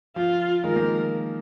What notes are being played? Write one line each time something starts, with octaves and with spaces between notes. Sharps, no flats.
F3 F4
D#3 G#3 A#4
F3 A#3